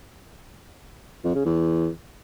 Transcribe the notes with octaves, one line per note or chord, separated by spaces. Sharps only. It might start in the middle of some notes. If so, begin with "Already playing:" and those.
F2
C#3
E2